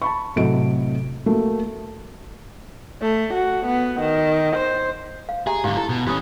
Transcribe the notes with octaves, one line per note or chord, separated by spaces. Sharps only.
A5 B5 C#6
A2 C3 F#3 A4 D#5 D7
A3 A#3 F#4
A3
F#4
B3
D#3
C5
F5
G4 G#4 E5 A#5
G#2 D3 G4 F5
E4 A4
B2
E3 C#4 G4 B5 D#6